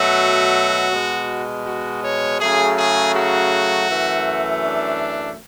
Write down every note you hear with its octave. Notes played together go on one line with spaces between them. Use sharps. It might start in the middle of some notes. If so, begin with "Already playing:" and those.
Already playing: B2 F#3 A3 F#4
B2 G#3
F#4
C#5
C#3 F#3 A3 G#4
G#4
F#4
F#2 E3 A3
D4